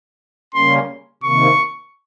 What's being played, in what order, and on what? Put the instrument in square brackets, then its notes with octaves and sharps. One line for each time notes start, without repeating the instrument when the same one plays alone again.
[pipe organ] C#3 G3 A#3 C#4 [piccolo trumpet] C6
[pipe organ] C3 D#3 A#3 [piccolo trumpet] C#6